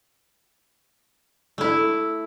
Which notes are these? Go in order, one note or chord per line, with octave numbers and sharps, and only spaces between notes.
A3 E4